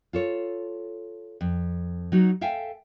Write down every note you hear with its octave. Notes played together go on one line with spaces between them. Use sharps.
F4 A4 C#5
F2
F#3 D#4 F#4
A4 E5 F5 G5 G#5